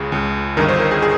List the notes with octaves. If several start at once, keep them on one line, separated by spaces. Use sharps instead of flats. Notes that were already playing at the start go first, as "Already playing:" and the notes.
Already playing: C#2 C#3 G#4
C#2 C#3
G1 G2 D#3 A#4
C5
A#4
G#4
G#4